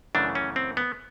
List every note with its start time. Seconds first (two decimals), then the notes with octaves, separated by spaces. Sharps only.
0.15 F#2 C#3 E3 A3 D4
0.35 C#4
0.56 C4
0.77 B3